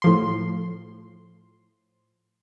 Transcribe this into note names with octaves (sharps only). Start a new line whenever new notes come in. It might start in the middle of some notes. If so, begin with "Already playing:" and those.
A2 F3 C6